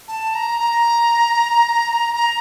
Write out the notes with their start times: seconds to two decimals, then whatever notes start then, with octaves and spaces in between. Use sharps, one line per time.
0.08 A5
0.35 A#5
0.60 A#5
2.15 A#5